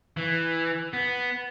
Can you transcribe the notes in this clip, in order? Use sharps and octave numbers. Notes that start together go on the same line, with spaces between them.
E3
B3